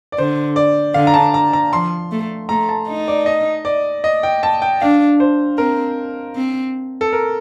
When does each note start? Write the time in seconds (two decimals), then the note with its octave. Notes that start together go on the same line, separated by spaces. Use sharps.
0.12 D5
0.18 D3 C5
0.56 D5
0.94 D3 F5
1.07 A#5
1.14 A5
1.34 A#5
1.53 A#5
1.73 F3 C6
2.11 A3
2.49 A3 A#5
2.69 A5
2.88 D#4
3.08 D5
3.26 D#5
3.65 D5
4.04 D#5
4.23 G5
4.43 A5
4.62 G5
4.81 D4 F5
5.20 C5
5.58 C4 A#4
6.36 C4
7.01 A4
7.13 A#4